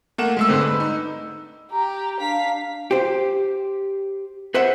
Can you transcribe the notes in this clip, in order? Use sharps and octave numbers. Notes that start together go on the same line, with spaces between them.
A3 A#3 F#5 E7
G#3 A3 E6
G#2 D3 C4
B4
D#4
G4 A#5
D4 F5 B6
G4 C5
G#4 B4 C5 E5 F#5